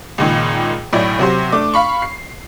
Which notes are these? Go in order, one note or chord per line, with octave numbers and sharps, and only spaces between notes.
C#2 A#2 D#3
B1 A2 E4 D5
C3 F#3 C5
A3 D4 D6
F5 B5 C#6
C7